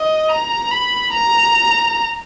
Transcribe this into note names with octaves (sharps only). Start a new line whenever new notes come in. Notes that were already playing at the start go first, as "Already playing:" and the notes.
Already playing: D#5
A#5
B5
A#5